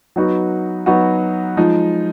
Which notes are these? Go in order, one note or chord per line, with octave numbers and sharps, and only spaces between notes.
F#3 B3 D#4 F#4
F#3 B3 D#4 F#4
F3 G#3 D#4